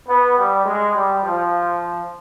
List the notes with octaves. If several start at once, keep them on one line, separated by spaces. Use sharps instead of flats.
B3
G3
G#3
G3
F3